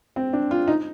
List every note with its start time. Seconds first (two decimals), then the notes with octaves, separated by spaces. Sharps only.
0.16 C4
0.33 D4
0.51 F4
0.68 D#4